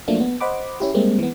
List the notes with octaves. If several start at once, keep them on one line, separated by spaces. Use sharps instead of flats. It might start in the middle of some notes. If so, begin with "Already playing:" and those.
F3 F#3 A3 A#3 D4
B3
C5 D#5 F#5 B5 D6
C#4 E4 G4
G3 G#3 A#3 C4
E3 B3